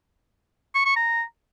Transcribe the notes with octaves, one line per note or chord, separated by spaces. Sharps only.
C#6
C#6
A#5